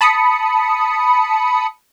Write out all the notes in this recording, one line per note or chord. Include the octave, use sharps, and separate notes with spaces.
A5 B5 D#6 C#7